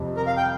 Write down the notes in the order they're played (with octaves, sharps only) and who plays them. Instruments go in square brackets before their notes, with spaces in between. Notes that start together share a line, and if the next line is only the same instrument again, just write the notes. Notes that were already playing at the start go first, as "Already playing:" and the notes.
Already playing: [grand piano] F2 C3 G3
[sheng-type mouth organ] A#4
F5
G5